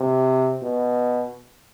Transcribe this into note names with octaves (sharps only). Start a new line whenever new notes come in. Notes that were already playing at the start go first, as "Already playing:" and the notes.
Already playing: C3
B2